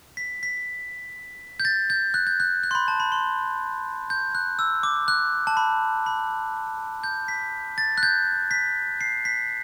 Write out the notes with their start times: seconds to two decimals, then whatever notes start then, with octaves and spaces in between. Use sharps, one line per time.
0.17 B6
0.43 B6
1.60 G6
1.65 A6
1.90 G6
2.14 F#6
2.27 G6
2.40 F#6
2.63 F#6
2.71 C6
2.75 B5
2.88 A5
3.00 B5
3.12 C6
4.10 G6
4.35 F#6
4.59 E6
4.83 D6
5.08 F#6
5.47 A5
5.57 B5
6.06 B5
7.04 G6
7.28 B6
7.78 A6
7.98 F#6
8.03 G6
8.51 B6
9.01 C7
9.25 B6